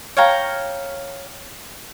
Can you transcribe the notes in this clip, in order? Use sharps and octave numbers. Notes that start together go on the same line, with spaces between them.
C#5 F5 G5 A#5